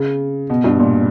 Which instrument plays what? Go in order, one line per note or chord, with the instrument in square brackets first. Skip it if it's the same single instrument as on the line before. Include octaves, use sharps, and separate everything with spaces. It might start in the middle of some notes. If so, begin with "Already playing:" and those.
Already playing: [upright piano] C#3
B2
G2
A#2